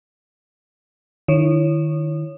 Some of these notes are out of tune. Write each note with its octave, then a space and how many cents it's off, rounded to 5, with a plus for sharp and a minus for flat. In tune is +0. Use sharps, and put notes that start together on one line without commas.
D#3 -30 E4 +20 C#5 -5